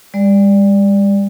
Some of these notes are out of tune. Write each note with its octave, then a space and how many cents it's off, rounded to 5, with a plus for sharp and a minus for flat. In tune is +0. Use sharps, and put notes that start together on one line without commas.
G3 +45 D5 +0